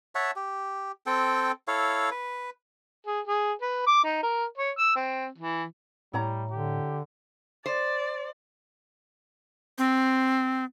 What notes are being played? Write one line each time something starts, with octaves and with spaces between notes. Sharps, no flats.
C#5 E5 F#5 A5
G4
C4 A4 G5
E4 A4 C#5 F5
B4
G#4
G#4
B4
D6
D#4
A#4
C#5
E6
C4
E3
A2 G3 E4 C#5 A#5
D3 G4
C5 D5
C4